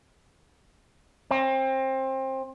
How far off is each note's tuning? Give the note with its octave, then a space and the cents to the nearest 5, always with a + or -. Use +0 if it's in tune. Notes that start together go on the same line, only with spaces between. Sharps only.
C4 +25